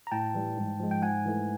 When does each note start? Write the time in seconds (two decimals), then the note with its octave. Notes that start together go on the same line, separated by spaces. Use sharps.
0.07 A#5
0.11 A2 G5 A5
0.34 E3 G3
0.57 G#2
0.80 F3 G#3
0.91 G5
1.02 G#2 F#5 G#5
1.25 E3 A3